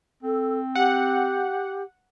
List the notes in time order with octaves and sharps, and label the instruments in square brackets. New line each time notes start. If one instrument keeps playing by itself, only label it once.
[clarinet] C4 [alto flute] A4
[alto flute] G4 [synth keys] F#5